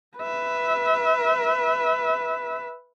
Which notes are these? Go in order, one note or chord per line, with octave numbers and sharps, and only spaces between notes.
B4 E5